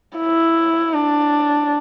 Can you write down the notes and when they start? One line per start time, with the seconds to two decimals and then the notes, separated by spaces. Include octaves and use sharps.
0.18 E4
0.94 D4